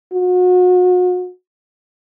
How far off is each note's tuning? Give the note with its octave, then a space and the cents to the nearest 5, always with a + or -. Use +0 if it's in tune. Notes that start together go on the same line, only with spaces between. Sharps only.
F#4 -35